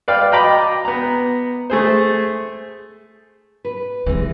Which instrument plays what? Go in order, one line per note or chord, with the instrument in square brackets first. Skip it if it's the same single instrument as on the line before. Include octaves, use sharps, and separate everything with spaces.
[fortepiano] B4 D5 F5 G5
D#5 G5 A#5 B5 D6
B3 A#5
A3 G#4 C5
[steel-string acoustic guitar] B4
[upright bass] D#2 C3 [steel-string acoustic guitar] E3 G#3